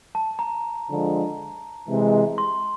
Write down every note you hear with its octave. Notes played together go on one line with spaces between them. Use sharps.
A5
A#5
D3 F3 G#3
C3 E3 G#3
C6